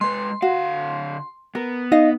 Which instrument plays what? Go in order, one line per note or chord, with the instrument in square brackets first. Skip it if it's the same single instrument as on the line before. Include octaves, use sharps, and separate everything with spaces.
[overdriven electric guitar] G#3 B4 [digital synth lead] C6
[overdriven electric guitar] D3 F5 [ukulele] F#4
[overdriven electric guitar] B3 [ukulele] A#4
[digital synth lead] D#4 [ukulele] D#5 F5